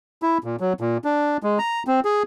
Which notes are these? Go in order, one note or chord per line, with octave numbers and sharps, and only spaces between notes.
E4
A#2
F#3
A#2
D4
G#3
A#5
C4
G#4